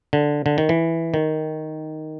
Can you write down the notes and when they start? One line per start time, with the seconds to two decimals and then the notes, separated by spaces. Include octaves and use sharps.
0.13 D3
0.46 D3
0.58 D#3
0.69 E3
1.14 D#3